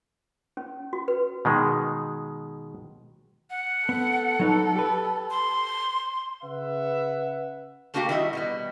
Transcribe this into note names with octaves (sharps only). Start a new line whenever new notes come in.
C#4
F#4
B4
B2 D#3 G#3
F#5
B3 A4
F#3 D#4 B4
G4 B4
C6
C#3 B4 E5 F#5
A3 A#3 D4 F#4 G4 F5
D#3 G3 E4 D#5 E5 F#5
B2 G3 B3